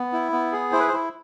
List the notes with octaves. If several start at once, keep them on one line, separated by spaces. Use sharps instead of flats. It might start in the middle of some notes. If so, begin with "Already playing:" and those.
Already playing: B3
E4
B3
G#4
E4 C5
B4
C5
E4